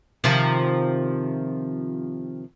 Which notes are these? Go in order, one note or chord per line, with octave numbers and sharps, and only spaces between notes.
C3 D#3 F3